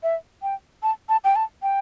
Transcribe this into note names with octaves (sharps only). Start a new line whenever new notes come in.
E5
G5
A5
A5
G5
A5
G5